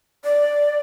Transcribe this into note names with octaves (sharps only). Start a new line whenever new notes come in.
D5